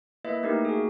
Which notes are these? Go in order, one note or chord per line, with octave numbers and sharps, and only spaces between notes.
A#3 E4 B4 D#5 E5
A3 A#3 D#4 G4 A#4
F#4 G#4